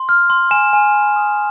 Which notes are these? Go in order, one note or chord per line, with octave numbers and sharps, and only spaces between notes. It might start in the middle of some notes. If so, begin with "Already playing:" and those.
Already playing: C6
F6
C6
G#5 E7
G#5
B5
D#6